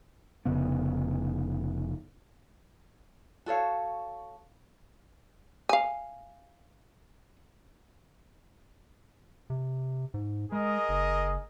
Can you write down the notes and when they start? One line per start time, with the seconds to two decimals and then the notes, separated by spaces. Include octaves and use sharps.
0.45 F1 C#3 B3
3.46 F#4 A4 C#5 F5
5.69 F5 G#5
9.50 C3
10.14 G#2
10.52 G#3 G#4 A#4 D#5
10.89 F#1